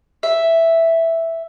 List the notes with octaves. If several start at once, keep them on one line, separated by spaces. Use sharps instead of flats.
E5